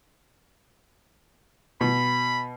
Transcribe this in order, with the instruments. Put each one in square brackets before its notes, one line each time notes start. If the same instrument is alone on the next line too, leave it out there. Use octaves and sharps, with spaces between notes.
[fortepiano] B2 [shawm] B5